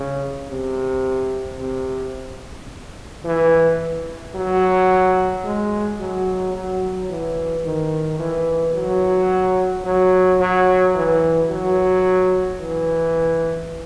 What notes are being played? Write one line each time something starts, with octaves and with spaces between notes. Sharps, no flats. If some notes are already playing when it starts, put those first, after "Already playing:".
Already playing: C#3
C3
C3
E3
F#3
G#3
F#3
F#3
E3
D#3
E3
F#3
F#3
F#3
E3
F#3
E3